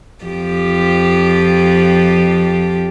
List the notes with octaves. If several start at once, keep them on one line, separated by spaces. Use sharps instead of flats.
F2 F3 G4